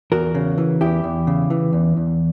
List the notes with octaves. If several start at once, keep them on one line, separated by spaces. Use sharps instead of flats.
E2 F#4 A#4
C#3
E3
E2 E4 G4
E2
C#3
E3
E2
E2